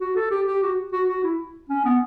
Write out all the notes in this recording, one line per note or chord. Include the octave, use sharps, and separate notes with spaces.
F#4
A4
G4
G4
F#4
F#4
F#4
E4
C#4
B3